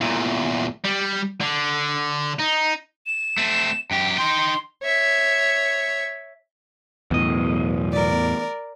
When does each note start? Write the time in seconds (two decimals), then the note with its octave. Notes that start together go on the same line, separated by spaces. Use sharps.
0.01 E2 A#2
0.84 G3
1.41 D3
2.39 D#4
3.06 E7
3.38 A3 C4
3.91 F#2 G4 G5
4.18 D#4 G5 C6
4.83 C#5 E5
7.11 B1 E2 A2 D#5
7.93 A#4 D5